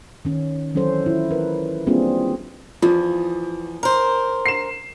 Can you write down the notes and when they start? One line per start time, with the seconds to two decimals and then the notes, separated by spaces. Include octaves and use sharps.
0.25 D#3 C#4
0.75 E3 F#3 C#4 A4 C5
1.06 E4 F4
1.30 A#4 B4
1.87 G3 A#3 C4 D4 F4 G#4
2.82 E2 F3
3.83 A#4 C5
4.46 C7 E7